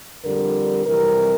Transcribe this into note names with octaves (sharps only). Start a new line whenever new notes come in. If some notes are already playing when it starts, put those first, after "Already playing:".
F2 D3 G3 A#4
F2 C3 E3 G3 A#4